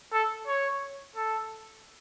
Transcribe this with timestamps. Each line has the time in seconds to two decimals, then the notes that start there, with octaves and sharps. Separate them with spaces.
0.12 A4
0.47 C#5
1.16 A4